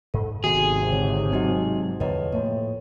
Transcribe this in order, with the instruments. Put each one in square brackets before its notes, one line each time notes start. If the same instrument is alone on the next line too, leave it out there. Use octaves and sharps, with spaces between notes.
[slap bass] G#2 [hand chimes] A4
[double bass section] G#1 C3 [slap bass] D#3 B3 [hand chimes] F#4 [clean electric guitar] G#4
[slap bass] D3 [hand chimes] C#5
[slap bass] F#3 G#3 [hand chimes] D#4 F#4 D#5
[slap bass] E2 D3 F3 [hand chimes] B4 C#5 D#5
[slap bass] A2 F3 [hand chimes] A#3 C#5